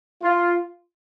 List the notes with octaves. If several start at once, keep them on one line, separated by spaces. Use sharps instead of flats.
F4